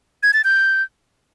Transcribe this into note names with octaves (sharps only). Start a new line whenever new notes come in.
G#6
A6
G6